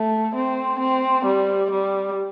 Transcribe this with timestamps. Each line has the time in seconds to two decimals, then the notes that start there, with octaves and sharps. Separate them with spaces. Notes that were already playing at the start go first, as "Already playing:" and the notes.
Already playing: A3
0.35 C4
0.79 C4
1.25 G3
1.71 G3